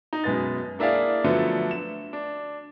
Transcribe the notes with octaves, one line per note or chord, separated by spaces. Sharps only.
D#4
F#2 B2 G#3 B3 A6
A#3 D4 E4 G#4 D5 F5
D3 F3 F#3 A3 B3
E7
D4